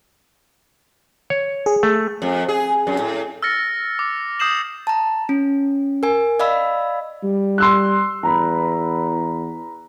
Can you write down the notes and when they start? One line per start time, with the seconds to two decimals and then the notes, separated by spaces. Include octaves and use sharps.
1.30 C#5
1.66 G#4
1.83 A3
2.22 F2
2.49 G#4
2.87 F#2
2.99 A2
3.43 E6 F6 A6 A#6 C#7
3.99 D6
4.39 D#6 G6 C7 E7 F#7
4.87 A5 A#5
5.29 C#4
6.03 A#4 G#5
6.40 D5 D#5 F5 B5 E6
7.23 G3
7.58 C6 E6 F#6
8.23 E2 A#5 B5